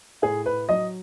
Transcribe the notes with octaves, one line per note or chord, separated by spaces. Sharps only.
A2 G#4
B4
F#3 D#5